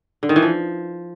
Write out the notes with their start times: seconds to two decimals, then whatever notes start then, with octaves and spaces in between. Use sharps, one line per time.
0.23 D3
0.29 D#3
0.36 E3
0.42 F3